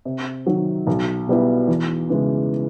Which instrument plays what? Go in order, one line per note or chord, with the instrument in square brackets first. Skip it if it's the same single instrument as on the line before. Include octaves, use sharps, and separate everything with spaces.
[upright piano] C3
D#3 F#3
B1
B2 G3 B3 E4
E2
C#3 E3 G#3